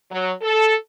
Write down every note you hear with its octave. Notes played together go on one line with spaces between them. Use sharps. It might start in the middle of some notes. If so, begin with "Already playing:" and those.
F#3
A4